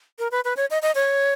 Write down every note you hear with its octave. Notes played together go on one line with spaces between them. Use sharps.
A#4
B4
B4
C#5
D#5
D#5
C#5